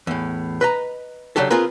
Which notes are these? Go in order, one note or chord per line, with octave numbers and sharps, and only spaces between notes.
E2 A2
B4 D#5 A#5
C#3 F#3 D4 G4 A4
C4 F4 G#4 A#4 B4